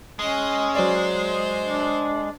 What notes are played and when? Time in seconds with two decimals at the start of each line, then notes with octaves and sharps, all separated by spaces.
0.19 G#3 C#4 D#5
0.75 F#3 C5 D5
1.62 D4